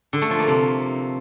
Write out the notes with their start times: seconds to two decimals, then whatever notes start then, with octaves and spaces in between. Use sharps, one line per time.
0.13 D3
0.22 A3
0.30 F3
0.39 A#3
0.48 C3